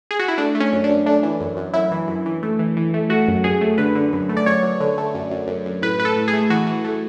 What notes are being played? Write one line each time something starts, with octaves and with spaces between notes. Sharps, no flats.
G#4
F#4
E4
A3 D4
A3
C#4
F#2
D4
F#2
A3 D4
E3
F#2
F#2
F#2 E4
E3
F#2
E3
A3
E3
E3
A3
A3 F#4
F#2
F#2 G#4
A3
D3 B4
D3
F#2
A3
D5
F#2 C#5
F#2
D3
A3
F#2
F#2
F#2
F#2
A2 B4
A2 B4
A4
A2
G#4
A3
E3 F#4
E3
A3